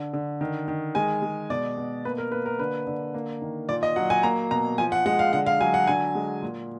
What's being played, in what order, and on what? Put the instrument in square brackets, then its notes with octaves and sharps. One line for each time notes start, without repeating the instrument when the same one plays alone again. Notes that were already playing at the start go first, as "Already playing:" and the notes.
Already playing: [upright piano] D3
D3
D#3
D#3
G#3 G#5
G#3
B2 D5
B2
A#3 B4
A#4
A#3 B4
A#4
D3 B4
D3
A#3
D#3
A#2 D5
D#5
F#3 F#5
G#5
A#3 A#5
B2 A#5
F3 G#5
F#5
G#3 F#5
F5
D3 F#5
F5
F#3 G#5
F#5
D3 G#5
G#3
A#2